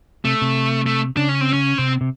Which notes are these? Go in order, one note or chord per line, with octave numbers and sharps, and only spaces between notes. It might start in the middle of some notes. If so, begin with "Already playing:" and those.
C3 A3
C3
A3
C#3 D4
C#4
C4
C#4
C3 C4
C3